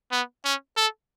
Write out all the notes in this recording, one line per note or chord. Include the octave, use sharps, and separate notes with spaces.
B3
C#4
A4